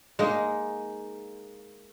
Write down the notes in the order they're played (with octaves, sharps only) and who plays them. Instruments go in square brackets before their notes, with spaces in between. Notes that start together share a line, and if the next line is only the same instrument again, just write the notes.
[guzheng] G#3 A#3 D#4